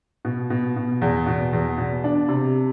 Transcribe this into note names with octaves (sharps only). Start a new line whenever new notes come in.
B2
B2
B2
E2
B2
E2
B2
D4
C3